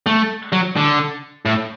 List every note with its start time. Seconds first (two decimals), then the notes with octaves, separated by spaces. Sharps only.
0.06 A3
0.52 F#3
0.77 D3
1.45 A2